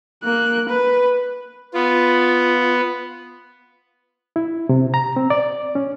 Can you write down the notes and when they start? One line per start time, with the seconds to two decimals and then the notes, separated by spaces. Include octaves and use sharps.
0.24 A#3 F#6
0.70 B4
1.74 B3 F4
4.36 E4
4.69 C3
4.94 A#5
5.16 C4
5.30 D5
5.75 C#4